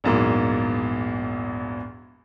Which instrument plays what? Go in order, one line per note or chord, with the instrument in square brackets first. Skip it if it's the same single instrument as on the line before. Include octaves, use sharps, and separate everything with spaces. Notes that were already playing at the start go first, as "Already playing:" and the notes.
[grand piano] A#1 E2 G#2 F#3 A#3